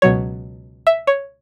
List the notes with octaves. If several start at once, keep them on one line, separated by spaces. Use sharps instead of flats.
C#2 B2 F#3 C#5
E5
C#5